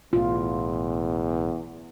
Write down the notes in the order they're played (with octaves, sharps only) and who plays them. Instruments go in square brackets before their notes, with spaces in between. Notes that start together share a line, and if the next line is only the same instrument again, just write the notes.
[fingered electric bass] B1 A2 [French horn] E2 [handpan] F4